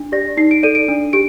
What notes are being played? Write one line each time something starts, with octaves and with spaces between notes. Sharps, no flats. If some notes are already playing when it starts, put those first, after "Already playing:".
Already playing: D4
G4 D5 A#6
D#4 C7
D7
A4 D5 D#7
D7
D4
G4 D7